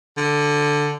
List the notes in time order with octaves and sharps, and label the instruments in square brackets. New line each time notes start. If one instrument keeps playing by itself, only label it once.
[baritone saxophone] D3